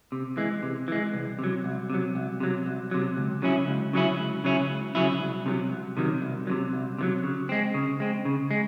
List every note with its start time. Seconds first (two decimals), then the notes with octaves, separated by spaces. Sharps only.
0.12 C3
0.37 E3 G#3
0.63 C3
0.88 E3 G#3
1.13 C2
1.39 C3 F#3
1.64 C2
1.90 C3 F#3
2.15 C2
2.40 C3 F#3
2.66 C2
2.91 C3 F#3
3.17 C#2
3.42 C#3 F#3 C#4 E4
3.68 C#2
3.93 C#3 F#3 C#4 E4
4.19 C#2
4.44 C#3 F#3 C#4 E4
4.70 C#2
4.95 C#3 F#3 C#4 E4
5.20 C2
5.46 C3 D#3 F#3
5.71 C2
5.97 C3 D#3 F#3
6.22 C2
6.47 C3 D#3 F#3
6.73 C2
6.99 C3 D#3 F#3
7.24 C#3
7.49 G#3 C4
7.74 C#3
8.00 G#3 C4
8.25 C#3
8.51 G#3